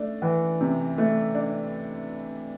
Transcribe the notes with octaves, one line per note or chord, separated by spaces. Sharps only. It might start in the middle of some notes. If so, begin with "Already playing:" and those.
Already playing: A3 D4
E3
C3
A3
D4